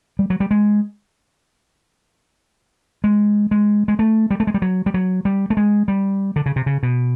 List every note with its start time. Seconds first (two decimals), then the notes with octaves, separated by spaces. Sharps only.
0.19 G3
0.30 F#3
0.40 G3
0.51 G#3
3.04 G#3
3.51 G#3
3.88 G#3
3.99 A3
4.31 G3
4.40 A3
4.47 G#3
4.54 G3
4.62 F#3
4.86 G3
4.94 F#3
5.25 G3
5.50 A3
5.57 G#3
5.88 G3
6.36 D3
6.46 C#3
6.56 C3
6.66 C#3
6.83 B2